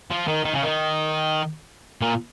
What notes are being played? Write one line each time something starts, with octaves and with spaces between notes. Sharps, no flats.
F3
D#3
D#3
C#3
D#3
A#2